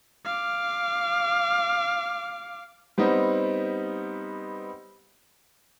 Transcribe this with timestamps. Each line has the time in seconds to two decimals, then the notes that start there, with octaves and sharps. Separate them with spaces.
0.25 F5 D6
2.98 G3 B3 C4 D#4